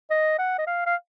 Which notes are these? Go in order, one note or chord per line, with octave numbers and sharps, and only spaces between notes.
D#5
F#5
D#5
F5
F5